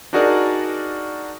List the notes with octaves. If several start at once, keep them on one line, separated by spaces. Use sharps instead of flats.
D4 D#4 F#4 G#4 A#4 D5